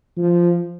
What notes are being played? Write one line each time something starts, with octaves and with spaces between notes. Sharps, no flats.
F3